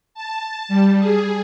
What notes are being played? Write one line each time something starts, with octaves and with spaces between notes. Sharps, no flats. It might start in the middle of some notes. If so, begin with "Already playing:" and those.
A5
G3
G#4